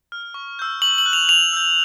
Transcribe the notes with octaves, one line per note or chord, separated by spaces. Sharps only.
F6
C#6
E6 G6
C#6 F#7
F#7
F#6
F7
C#6 F7
E6 G6